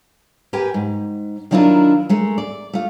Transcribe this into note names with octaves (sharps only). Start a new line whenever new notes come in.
G4 A#4 B4 G5 G#5
G#2
D#3 F#3 D4 E4 F4 A#4
G#3 A3 A#4
D5
A3 F4